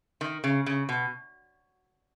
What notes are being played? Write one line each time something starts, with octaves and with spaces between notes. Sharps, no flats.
D#3
C#3
C#3
B2